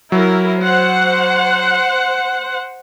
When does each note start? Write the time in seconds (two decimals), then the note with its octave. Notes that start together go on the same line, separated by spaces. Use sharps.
0.12 F#3 E4 A#4
0.62 C5 F#5